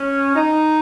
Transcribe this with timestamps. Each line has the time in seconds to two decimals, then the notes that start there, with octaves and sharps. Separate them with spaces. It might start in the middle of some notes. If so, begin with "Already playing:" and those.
Already playing: C#4
0.36 D#4